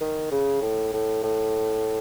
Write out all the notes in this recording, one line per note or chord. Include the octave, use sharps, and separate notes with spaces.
D#3
C#3
A2
A2
A2